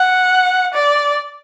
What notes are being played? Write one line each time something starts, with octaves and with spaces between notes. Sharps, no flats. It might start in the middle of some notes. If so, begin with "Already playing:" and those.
Already playing: F#5
D5